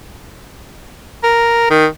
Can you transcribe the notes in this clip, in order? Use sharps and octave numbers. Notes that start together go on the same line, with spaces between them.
A#4
D#3